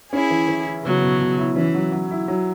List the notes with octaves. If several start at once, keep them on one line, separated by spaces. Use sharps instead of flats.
C#4 E4 G#4
E3
E3
E4
C#3 F#3 B3
B2
B2
E4
E3 C#4
F#3
F#3
E4
F#3